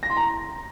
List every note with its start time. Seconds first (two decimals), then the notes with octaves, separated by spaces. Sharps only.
0.03 A#6
0.10 C6
0.17 A#5